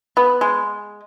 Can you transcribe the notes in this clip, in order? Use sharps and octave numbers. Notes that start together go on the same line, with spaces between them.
B3
G#3